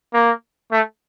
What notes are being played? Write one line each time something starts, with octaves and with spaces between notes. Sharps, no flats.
A#3
A3